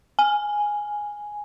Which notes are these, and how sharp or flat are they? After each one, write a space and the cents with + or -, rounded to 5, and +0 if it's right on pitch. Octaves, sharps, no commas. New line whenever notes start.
G#5 +0